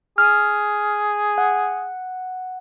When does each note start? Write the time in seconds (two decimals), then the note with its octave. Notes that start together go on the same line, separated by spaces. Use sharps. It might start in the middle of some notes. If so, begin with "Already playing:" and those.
0.18 G#4 F6
1.38 F#5